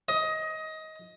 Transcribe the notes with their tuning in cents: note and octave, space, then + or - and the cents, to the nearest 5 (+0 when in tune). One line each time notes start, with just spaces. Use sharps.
D#5 +20